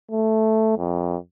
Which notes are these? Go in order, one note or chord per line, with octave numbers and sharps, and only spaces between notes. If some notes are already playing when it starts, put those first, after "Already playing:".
A3
F2